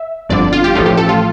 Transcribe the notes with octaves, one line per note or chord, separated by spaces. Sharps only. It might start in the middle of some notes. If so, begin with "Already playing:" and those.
Already playing: E5
G1 F2 D3 D5
F4
G4
A1 A2 F3 A3 F4
G4
A4
F4